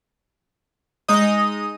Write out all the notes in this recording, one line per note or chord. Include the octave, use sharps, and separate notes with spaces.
G#3 D#4 D#5 D#6